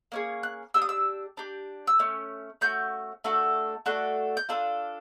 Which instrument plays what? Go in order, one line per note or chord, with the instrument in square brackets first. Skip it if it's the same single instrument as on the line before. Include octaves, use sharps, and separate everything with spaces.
[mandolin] A#3 C#4 G#4
F#6
D4 G4 E6
D#6
E6
D4 G4
E6
A3 C#4
A3 C#4 F#4 G6
A3 D4 F#4 A4
A3 D4 F#4 A4 F#6
G6
D4 F4 A4 F#6